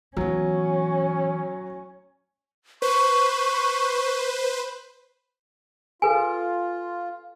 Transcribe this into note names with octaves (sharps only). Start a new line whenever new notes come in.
E3 F#3 B3 C#4
B4 C5 C#6
F4 A4 B4 G#5